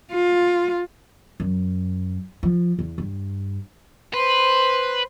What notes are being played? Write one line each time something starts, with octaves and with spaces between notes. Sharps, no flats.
F4
F#2
F3
E2
G2
B4 C5 C6